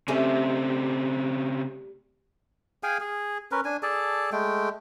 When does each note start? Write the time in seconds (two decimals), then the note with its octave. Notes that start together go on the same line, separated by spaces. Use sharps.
0.08 C#3 G3 A3 C4 C#4
2.83 G#4 F5 G5 G#5
3.00 G#4
3.52 C#4 A#4 B4
3.65 D4 G#5
3.83 G#4 A4 D5 A5
4.32 G#3 A3 G5